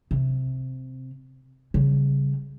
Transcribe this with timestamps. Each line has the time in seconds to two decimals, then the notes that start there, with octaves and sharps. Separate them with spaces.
0.11 C3
1.74 C#3 G3